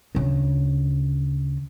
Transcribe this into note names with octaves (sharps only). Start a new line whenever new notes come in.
D2 C#3